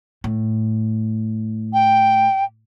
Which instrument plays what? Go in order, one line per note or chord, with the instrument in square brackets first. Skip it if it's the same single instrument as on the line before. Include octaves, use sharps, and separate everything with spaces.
[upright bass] A2
[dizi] G5